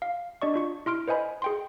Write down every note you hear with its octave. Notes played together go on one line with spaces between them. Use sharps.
F5
D4 D5 D#5 C#6
D4 F4 C#6
E4 C6 F6 D7
B4 C5 D#5 G#5 B5
G#4 G5 C6